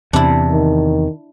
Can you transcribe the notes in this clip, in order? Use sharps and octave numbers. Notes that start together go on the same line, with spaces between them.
E2 C3 D4 E4
D#3